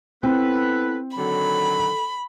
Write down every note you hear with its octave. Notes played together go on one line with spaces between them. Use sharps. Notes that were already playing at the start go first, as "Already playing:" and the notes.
B3 C4 E4 A4 B4
D3 D#3 F#3 A4 B5